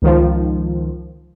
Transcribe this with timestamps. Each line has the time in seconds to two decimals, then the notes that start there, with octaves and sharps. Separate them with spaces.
0.02 C#2 D#3 F3